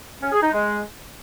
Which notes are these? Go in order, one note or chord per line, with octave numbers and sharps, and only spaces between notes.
C#4
G#4
D#4
G#3